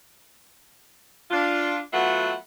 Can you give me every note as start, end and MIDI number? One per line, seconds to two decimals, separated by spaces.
1.31 1.79 62
1.31 1.79 65
1.93 2.34 54
1.93 2.34 57
1.93 2.34 59
1.93 2.34 65
1.93 2.34 76
1.93 2.34 78